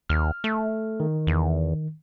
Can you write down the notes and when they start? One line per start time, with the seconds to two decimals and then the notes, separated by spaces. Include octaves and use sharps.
0.09 D#2 F6
0.44 A3
1.00 D#3
1.27 E2